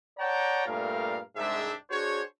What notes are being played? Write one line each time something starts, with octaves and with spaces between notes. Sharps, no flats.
C#5 D5 F#5 G5 A5 A#5
G2 A#2 A3 A#4 F5
C2 G#2 G#3 D4 G4 E5
D4 F#4 G#4 C5 C#5